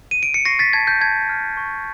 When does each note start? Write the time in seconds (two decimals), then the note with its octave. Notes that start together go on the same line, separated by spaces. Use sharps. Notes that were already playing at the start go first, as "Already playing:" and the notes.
0.11 D#7
0.23 D7
0.34 C#7
0.45 C#6 A#6 C7
0.59 A6 B6
0.73 A5 G#6
0.87 G6
1.01 A5 G#6
1.29 F6
1.57 C#6